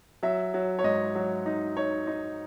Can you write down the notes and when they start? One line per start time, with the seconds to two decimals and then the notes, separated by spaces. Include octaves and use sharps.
0.23 F#3 E5
0.54 F#3
0.79 C#5
0.84 G#2 D#5
1.15 F#3
1.46 D#4
1.77 D#4 C#5
2.07 D#4